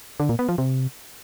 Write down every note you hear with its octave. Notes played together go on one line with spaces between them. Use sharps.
D3
A#2
B3
F3
C3